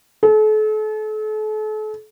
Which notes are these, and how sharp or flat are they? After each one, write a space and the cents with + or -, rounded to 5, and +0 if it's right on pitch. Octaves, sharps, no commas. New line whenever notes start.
A4 -40